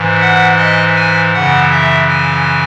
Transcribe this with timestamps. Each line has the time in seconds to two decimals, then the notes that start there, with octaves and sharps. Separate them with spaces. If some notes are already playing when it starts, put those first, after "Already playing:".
Already playing: G#2 E3
0.20 F#5
0.57 D#5
0.95 G#5
1.33 F#2 C#3 E3 F#5
1.70 E5
2.08 G#5